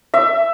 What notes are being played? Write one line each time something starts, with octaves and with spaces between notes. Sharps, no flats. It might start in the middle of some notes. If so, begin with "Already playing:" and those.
E5